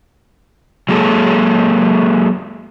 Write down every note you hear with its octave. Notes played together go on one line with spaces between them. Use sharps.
F#3 G#3 A#3 F#4 G#4 A4